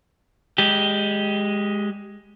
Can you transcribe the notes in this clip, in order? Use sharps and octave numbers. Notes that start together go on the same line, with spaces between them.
G#3 G4